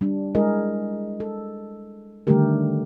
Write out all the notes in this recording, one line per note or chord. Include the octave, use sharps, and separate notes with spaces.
G3 D4
G#3 E4 G#4 A#4 D#5
A4
D3 D#3 G3 A3 G4 A#4